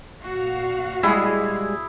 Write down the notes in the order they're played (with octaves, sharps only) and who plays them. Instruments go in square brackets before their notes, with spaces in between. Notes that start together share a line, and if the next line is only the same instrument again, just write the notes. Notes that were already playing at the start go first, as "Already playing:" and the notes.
[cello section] A#2 F#4 F5
[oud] G3 G#3 [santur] E4 G#4